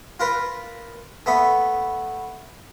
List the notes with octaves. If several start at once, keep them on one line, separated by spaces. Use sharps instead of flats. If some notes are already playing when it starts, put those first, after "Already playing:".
F4 A#4 B4
A3 B3 B5